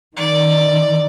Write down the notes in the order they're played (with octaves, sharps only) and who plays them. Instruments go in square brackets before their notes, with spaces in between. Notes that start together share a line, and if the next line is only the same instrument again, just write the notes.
[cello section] D#3 [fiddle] D5